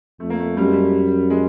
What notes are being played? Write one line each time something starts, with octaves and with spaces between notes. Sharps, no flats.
F2 A3
A#3
A3
F#2 G3
G#3
G3
G#3